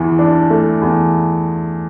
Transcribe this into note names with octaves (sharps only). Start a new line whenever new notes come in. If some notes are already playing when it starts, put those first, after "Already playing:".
Already playing: E2 E3
D4
A3
E2